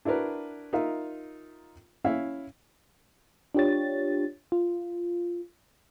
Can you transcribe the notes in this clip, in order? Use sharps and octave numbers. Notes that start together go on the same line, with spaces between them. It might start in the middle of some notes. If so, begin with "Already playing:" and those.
D4 E4 F#4 A#4 B4
D#4 F4 A#4 E5 F5
C#4 E4 E5 F5
D4 F4 G4 C#5 A6
F4